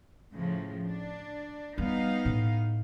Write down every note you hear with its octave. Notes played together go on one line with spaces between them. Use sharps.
A2 C#3 F3
D4
G3 B3 D#4 F5
A2